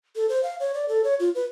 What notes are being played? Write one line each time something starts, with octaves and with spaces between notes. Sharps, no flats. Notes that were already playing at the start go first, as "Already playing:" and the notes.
A4
C5
F5
C#5
D5
A4
C#5
F4
B4